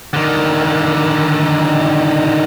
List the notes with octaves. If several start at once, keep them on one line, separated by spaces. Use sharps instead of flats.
D3 D#3